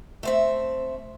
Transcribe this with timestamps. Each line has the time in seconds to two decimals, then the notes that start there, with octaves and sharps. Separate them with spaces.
0.23 A3 C4 E5